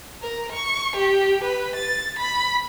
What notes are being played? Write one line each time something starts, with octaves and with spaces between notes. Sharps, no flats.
A#4
C#6
G4
B4
A6
B5